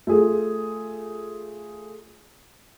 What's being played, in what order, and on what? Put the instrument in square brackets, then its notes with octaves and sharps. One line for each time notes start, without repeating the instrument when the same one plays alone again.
[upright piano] A3 F4 G#4